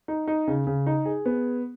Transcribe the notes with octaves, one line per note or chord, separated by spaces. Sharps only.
D#4
D#4
C#3
C#3
D#4
G#4
B3